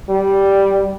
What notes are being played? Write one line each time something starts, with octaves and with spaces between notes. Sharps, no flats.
G3